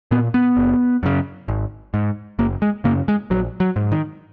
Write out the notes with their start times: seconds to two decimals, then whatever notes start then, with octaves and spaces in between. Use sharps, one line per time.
0.11 A#2 B3
0.34 B3
0.57 F#1
1.03 F#2 C#3
1.48 G#1
1.94 G#2
2.39 F#1 A#3
2.62 G#3
2.84 F#2 C#3 A#3
3.08 G#3
3.30 A#1 F#3
3.60 F#3
3.76 G#2
3.92 D#3